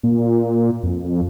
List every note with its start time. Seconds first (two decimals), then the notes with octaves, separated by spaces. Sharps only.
0.03 A#2
0.83 F2